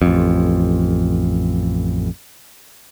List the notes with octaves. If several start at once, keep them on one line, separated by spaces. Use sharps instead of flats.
A1 F2